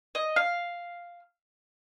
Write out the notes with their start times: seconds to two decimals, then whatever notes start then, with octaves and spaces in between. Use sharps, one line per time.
0.15 D#5
0.36 F5